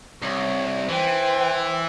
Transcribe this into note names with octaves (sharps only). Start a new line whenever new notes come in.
C2 C#5
E3 C5 G5